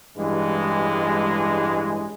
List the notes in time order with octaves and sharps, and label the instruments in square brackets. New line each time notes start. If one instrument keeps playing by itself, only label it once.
[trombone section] A1 G2 E3 G#3